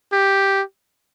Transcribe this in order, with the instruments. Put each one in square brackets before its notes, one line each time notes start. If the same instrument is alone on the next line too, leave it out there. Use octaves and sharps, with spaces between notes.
[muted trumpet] G4